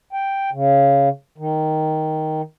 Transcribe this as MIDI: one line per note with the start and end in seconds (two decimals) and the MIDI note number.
0.13 0.50 79
0.52 1.09 49
1.38 2.42 51